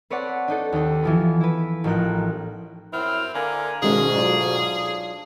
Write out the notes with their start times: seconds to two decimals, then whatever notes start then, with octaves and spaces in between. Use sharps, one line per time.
0.10 C4 B4 C#5 D5 F#5 A5
0.48 D4 D#4 A4
0.72 D#2 D#4
1.03 E3 F3 B3
1.41 E4 B4
1.84 A1 F3 D#4 G4 A#4 F#6
2.93 F#2 C4 E4 F6
3.34 D3 A#3 A#4 G#5
3.82 D2 G#2 B2 D#3 G#3 C#4 G#4
4.15 F#3 D4 F4